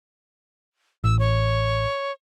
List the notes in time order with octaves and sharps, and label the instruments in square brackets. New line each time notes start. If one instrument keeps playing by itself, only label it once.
[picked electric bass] A1 [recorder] E6
[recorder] C#5